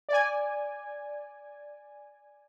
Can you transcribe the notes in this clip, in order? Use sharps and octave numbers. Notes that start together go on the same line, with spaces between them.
D5 G#5